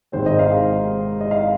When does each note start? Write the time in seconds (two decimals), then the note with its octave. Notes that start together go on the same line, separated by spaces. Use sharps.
0.12 G#1 G#2 D#3 C4 C5
0.26 D#5
0.39 F5
1.21 D#5
1.31 F5